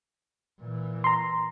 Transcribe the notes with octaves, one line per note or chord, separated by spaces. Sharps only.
A#2 E3
A#5 C6